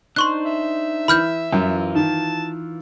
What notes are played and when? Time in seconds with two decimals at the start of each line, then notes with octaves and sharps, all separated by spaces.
0.16 D4 D#4 C5 C6 C#6 F#6
0.45 E5
1.08 E3 B5 F6 G6
1.53 F#2 E3 F4
1.95 D#3 A5